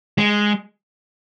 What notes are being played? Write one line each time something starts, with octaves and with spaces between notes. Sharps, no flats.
G#3